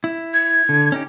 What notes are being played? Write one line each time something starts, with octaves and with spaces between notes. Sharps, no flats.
E4
G#6
D3
C#4 D#4 G4